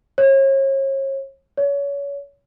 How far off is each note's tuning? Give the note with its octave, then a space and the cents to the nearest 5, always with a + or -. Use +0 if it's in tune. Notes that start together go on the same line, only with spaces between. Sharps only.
C#5 -35
C#5 +30